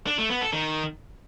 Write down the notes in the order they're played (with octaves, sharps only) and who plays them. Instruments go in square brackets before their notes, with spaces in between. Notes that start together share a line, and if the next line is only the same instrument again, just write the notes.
[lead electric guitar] D4
A3
B3
A4
D#3